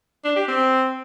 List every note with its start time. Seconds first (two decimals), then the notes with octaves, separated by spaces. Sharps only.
0.24 D4
0.36 G4
0.48 C4